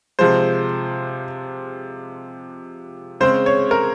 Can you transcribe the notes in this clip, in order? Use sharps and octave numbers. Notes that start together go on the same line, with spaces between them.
C3 F3 G#3 C5
C#3 G#3 C4 C5
C#5
A#4